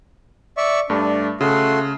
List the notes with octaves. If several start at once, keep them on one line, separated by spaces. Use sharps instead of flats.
D5 E5 C#6
G2 A3 D4
C#3 A3 F#4 C6